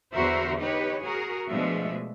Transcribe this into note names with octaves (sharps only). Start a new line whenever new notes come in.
E2 D3 F#4 A#4 C5 E5
D#4 G4 B4 C#5
F#4 G#4 A#4
B2 F3 G#3 A3 D4 E5